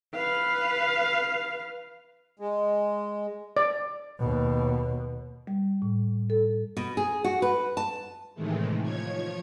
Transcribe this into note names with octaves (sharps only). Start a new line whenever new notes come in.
B4 F5
G#3
D5
D#2 B2
G3
A2
A4
B2
G#4
F#4
B4
A5
A2 C3 D#3 E3 G#3 A3
F3 C#5 G#6